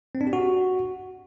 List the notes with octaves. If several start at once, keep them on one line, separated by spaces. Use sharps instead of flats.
C4
D4
G4
F#4